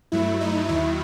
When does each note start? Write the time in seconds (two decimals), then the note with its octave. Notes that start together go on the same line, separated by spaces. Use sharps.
0.12 G2 F#3 A3 E4
0.41 D#4
0.68 D#2 D#3 F#3 E4